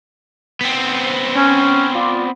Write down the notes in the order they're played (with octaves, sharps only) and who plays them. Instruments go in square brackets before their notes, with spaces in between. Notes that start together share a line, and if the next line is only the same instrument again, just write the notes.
[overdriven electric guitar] B3 C4
[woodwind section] C#4
F4 D5